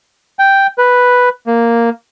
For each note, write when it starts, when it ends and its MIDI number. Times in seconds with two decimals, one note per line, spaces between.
0.39 0.67 79
0.78 1.29 71
1.47 1.90 58